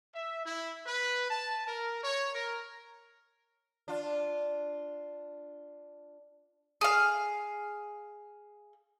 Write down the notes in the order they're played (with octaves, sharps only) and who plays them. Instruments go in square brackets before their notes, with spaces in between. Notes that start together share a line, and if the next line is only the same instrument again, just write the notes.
[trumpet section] E5
E4
B4
A5
A#4
C#5
A#4
[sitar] D4 F4
[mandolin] G#4 F5